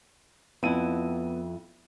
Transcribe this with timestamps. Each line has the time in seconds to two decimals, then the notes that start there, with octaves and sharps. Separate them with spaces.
0.63 F2 B3 E4 D#7